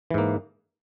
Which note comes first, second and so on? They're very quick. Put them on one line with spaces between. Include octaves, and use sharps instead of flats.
E3 G#2 A#3